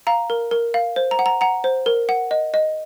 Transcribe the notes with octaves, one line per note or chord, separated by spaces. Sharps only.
F5 A#5
A#4
A#4
F5
C5
A#5
F#5
A#5
F#5 A#5
C5
A#4
F#5
D#5
D#5